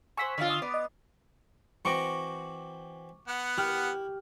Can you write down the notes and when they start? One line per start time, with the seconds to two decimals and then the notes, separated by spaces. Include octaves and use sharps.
0.17 C5 F#5 G#5 C#6 E6 B6
0.38 D3 F4 C#5 D5 F5
0.50 C#6 D#6 E6
0.62 B3 D5
0.74 D#5
1.85 E3 C4 F#4 C#6 D6 A#6
3.28 B3 F#5
3.58 E4 G4 F6